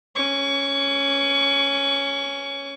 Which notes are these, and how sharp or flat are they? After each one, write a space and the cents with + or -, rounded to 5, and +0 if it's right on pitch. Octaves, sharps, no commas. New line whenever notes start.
C#4 +0 C#6 +30